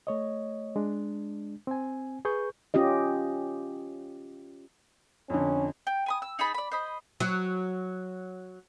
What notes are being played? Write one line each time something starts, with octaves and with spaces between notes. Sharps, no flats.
A3 C#5 D#5
G#3 D4
C4 G#5
G#4 B4 C#6 G6
C#4 F4 G4 D#5
F2 D3 C#4
G5
G#5 B5 D#6
E6
D#4 G#4 A5 B5
D5 B5
C5 D#5 B5
F#3